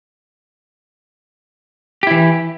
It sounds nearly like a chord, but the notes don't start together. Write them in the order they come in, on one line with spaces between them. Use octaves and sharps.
G4 E4 E3